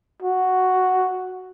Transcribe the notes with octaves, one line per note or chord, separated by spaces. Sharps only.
F#4